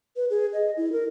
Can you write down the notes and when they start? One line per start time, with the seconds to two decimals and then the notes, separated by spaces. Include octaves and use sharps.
0.16 B4
0.30 G#4
0.53 D#5
0.77 E4
0.92 A#4